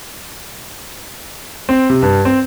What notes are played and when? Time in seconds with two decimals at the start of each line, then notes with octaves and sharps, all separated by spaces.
1.69 C4
1.90 C3
2.02 G2
2.25 C4